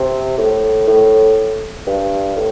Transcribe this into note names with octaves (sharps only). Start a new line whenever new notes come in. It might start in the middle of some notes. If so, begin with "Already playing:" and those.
Already playing: C3
A2
A2
G2
A2